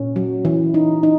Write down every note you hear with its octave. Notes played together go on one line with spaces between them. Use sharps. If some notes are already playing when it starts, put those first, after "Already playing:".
Already playing: A#2 C#4
F#3
E3
D#4
D#4